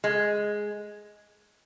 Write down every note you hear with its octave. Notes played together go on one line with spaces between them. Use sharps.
G#3